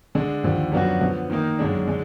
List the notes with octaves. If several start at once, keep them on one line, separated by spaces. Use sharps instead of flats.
D3 G#3 D4
D#2 D3 F3
F#2 F3 B3 D4 F#4
D3 F3 B3
D#3 A#3 D#4
F#2 D3 G#3 D4
D3 G#3